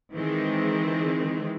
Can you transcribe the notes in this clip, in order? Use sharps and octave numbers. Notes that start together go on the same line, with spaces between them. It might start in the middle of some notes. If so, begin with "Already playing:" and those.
D#3 E3 G#3 C4